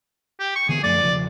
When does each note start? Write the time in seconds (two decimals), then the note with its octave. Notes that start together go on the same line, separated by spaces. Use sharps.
0.40 G4
0.56 C#6
0.69 D3 E3 B3 G#4
0.83 F#2 F3 A3 D5
1.03 E1 C#3 F3